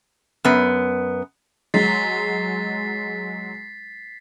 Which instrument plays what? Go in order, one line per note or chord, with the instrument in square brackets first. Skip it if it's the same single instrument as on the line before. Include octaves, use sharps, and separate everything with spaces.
[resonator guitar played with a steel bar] F#2 B3
[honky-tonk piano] F#3 G#3 [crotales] A6 B6 C7